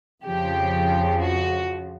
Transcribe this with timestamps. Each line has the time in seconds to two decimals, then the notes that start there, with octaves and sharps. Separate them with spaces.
0.24 F2 C#3 F3 G4
1.21 F#4